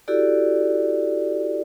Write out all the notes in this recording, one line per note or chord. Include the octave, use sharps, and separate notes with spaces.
E4 F#4 G4 A4 D5